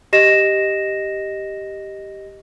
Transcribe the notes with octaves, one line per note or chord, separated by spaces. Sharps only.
G4 D#5 A#6 E7